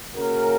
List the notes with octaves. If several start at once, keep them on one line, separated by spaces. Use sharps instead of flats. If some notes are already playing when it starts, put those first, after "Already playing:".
C#3 A#3 C#4 F#4 A#4